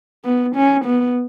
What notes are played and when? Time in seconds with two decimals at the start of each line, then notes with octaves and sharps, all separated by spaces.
0.25 B3
0.55 C#4
0.85 B3